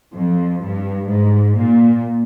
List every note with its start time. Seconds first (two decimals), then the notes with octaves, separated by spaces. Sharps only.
0.15 F2
0.62 G2
1.09 G#2
1.56 A#2